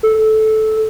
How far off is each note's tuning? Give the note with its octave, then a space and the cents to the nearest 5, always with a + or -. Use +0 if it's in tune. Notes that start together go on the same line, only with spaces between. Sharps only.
A4 -15